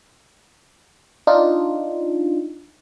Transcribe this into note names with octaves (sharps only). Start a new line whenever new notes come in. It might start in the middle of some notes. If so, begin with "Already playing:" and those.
D4 D#4 F4